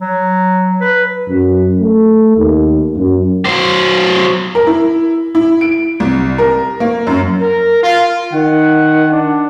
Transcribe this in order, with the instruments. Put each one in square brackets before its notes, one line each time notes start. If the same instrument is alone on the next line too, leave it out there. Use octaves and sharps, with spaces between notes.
[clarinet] F#3
B4
[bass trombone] F#2
A3
D#2
F#2
[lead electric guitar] F#3 C5
[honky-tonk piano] A#4
E4
E4
D7
C2
A#4
A#3
F#2
[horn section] A#4
F4
[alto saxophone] D#3 [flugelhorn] F#5
[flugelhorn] D4